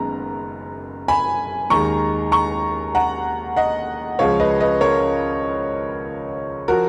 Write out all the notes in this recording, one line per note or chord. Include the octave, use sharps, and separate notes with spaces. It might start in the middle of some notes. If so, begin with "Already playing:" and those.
Already playing: F#1 F#2 D#3 G#3 B3 A#5
G#5 B5
D#2 D#3 G#3 A#5 C#6
A#5 C#6
F#5 A#5
D#5 F#5
C#2 C#3 F3 G#3 C#5 F5
B4 D#5
B4 D#5
A#4 C#5
F3 F#4 A#4